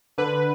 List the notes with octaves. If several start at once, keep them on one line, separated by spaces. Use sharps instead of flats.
D3 B4